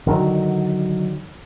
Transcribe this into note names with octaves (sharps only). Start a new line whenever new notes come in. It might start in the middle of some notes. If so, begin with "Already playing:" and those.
D3 D#3 F#3